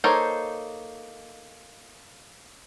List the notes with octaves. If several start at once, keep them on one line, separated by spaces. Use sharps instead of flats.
A#3 D#4 A4 C5 C#5